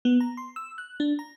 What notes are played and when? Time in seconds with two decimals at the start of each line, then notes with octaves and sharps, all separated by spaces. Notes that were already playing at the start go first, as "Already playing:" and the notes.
0.05 B3
0.21 A#5
0.37 C6
0.56 E6
0.78 F#6
1.00 D4
1.19 A#5